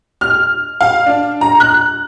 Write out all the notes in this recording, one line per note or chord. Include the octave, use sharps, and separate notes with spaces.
F6
F5
D4
A#5
F#6